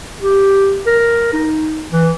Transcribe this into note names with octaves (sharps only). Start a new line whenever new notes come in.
G4
A#4
D#4
E3